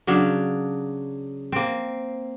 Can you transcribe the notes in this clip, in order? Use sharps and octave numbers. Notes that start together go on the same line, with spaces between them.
C#3 F#3 D4 F5
A#3 C4